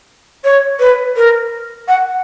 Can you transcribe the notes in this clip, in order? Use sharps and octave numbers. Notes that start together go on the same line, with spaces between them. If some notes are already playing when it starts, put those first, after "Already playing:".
C#5
B4
A#4
F#5